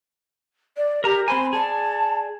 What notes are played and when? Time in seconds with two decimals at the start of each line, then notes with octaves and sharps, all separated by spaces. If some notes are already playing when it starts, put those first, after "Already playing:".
0.77 D5
1.04 G4 A#4 A#5
1.28 C4 C5 G#5 B5
1.53 G#4 D5 A5